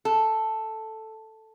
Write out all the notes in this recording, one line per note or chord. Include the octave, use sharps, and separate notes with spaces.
A4